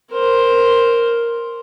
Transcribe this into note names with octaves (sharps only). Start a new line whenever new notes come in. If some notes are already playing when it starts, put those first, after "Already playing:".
A#4 C5